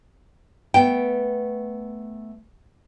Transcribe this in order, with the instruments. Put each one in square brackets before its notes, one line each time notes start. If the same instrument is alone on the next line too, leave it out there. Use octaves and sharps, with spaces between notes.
[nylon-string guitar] A3 B3 G5